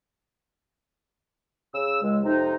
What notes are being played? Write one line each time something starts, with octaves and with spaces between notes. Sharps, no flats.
C#3 E6
C#2 G#3
F2 C3 D#4